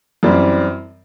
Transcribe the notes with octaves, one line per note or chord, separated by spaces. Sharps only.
F#2 E3 G3 C4